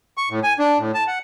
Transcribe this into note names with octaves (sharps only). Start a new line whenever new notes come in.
C#6
A2
G#5
D4
A2
A5
F#5